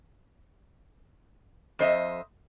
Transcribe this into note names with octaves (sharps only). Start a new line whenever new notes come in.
F2 C5 D#5 E5